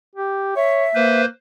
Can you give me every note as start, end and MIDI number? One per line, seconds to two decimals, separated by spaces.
0.15 0.56 67
0.56 0.85 73
0.56 1.21 76
0.95 1.25 58
0.95 1.25 71
0.95 1.25 72